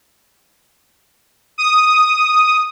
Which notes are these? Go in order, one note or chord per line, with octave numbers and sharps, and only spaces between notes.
D#6